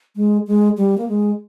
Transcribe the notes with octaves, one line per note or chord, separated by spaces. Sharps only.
G#3
G#3
G3
A#3
G#3